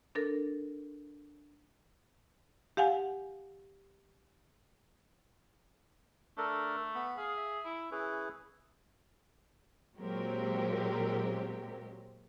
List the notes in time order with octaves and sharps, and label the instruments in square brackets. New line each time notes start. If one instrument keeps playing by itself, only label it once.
[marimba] D4 A4 A#4
G4 F5 F#5 G#5
[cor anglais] A3 [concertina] D4 A4 A#4
[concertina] B3 B5
[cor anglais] G#4 [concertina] F5
[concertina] E5
[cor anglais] E4
[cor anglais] C#4 [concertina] E4 G#4 B4
[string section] A#2 F#3 G#3 C4 G4 A#4